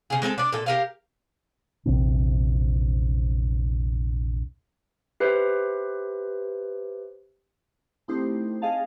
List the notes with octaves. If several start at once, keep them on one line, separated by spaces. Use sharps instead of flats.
C#3 G#4
G#3 C4 A4 A5
D4 D5
A#2 A4
G4 A#4 F5
A#1 E2 C3 C4
G4 B4 C5 E5
A3 C4 D#4 E4 G4 C5
G#4 D#5 F5 A5